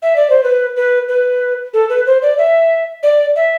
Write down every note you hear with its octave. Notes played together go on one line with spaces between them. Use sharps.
E5
D5
C5
B4
B4
B4
A4
B4
C5
D5
E5
D5
E5